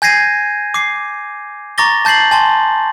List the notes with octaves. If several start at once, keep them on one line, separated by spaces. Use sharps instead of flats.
G#5 G6 G#6 A#6 C7 D#7
D6 C7
A#5 C#6 D6 A6 A#6 G7
A5 G6 A6 C7 F#7
G#5 A5 C6